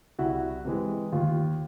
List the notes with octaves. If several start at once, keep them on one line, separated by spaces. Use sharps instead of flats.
C2 E4 F#4
C3 E3 G#3
D#2 F4